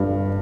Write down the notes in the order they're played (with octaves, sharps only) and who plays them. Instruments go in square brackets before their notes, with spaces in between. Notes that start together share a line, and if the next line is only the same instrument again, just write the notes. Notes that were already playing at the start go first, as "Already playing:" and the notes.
Already playing: [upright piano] G1 G2